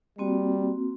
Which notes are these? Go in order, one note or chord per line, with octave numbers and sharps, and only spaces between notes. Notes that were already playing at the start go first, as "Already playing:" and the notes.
G3 A#3 C4 F#4